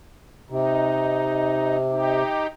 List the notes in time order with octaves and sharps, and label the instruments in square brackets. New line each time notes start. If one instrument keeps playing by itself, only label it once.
[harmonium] C3 [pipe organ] D#4
[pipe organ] D#4 G4